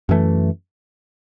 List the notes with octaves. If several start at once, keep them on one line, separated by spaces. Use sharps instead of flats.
F#2 E3 A3